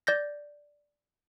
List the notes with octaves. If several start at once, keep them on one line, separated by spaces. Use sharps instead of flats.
D5 G6 A#6